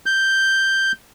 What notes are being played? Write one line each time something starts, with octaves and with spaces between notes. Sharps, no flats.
G6